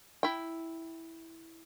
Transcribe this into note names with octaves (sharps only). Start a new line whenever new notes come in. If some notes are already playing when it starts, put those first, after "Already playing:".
E4 G5